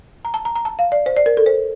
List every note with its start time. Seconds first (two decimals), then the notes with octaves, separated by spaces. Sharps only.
0.25 A#5
0.34 A5
0.45 A#5
0.56 A#5
0.65 A5
0.79 F5
0.92 D5
1.06 C5
1.17 D5
1.26 A#4
1.37 A4
1.46 C5